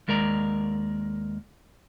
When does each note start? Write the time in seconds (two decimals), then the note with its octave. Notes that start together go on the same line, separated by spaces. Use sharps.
0.08 D#2 G#3 A#4 D5 A#5